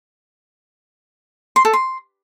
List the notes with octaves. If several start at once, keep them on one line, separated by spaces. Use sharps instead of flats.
C6
A4
C6